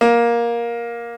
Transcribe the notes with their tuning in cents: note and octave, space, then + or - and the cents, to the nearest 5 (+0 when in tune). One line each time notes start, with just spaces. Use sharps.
A#3 +15